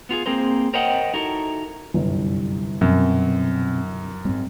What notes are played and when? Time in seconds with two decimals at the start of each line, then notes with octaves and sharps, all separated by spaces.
0.09 B3 F4 F#4 G#4
0.26 A#3 C4 G#4 A#4 C5
0.74 A#4 C5 C#5 D#5 F#5 G5
1.14 D#4 E4 F#4 A4 A#4
1.94 G1 C2 F#2
2.81 F#2 B2 C4
4.25 G#2 G3 C4